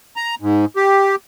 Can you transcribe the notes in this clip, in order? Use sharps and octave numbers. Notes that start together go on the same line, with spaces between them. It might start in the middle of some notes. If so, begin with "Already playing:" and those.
A#5
G#2
G4